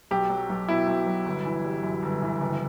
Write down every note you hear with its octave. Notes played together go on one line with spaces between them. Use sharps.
B1 G4
F#3
B1
B2 E4
B1
F#3
G1
E3
G3
F#2
G1
E3
F#1